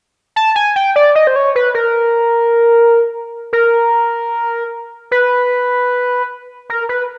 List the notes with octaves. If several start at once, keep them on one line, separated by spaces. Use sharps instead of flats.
A5
G#5
G5
D5
D#5
C5
C#5
B4
A#4
A#4
B4
A#4
B4